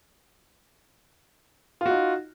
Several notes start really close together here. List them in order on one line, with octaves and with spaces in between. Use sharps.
F4 F#4 D#4